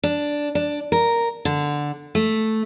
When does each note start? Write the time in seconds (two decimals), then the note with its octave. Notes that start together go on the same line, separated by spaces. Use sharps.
0.03 D4
0.55 D4
0.92 A#4
1.45 D3
2.15 A3